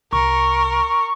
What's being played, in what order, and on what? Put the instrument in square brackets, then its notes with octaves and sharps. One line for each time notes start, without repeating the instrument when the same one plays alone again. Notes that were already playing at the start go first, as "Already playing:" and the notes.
[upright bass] C2 [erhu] A#4 [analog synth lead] C#6